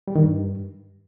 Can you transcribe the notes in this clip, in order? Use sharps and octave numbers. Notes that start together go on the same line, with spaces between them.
G3
D#3
G2